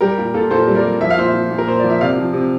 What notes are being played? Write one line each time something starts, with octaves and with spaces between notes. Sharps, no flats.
G3 G4 A#4
A#2
A#2 F4 A4
A#2 A4 C5
G3
A#4 D5
G3
F3 E5
F5
A#2 C5 E5
F3
A#2
A#4
A#2 C5
F3 D5
E5
C3 D5 F5
F3
C3